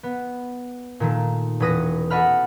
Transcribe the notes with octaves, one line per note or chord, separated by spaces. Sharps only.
B3
A#2 D#3 A3
E1 C#4 B4 D#6 A#6
F#4 A4 D#5 F#5 B5 F6